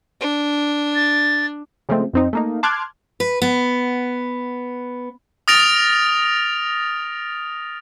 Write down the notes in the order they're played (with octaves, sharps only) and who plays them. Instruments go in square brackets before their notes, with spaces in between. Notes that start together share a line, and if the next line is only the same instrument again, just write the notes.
[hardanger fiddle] D4
[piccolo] A6
[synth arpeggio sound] C#3 F3 G#3 A3 C4
F2 C4 D#4
A3 A#3 D#4
A5 C6 D6 F6 F#6 G#6
[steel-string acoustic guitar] B4
B3
[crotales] D#6 F6 A6 A#6 D7 F7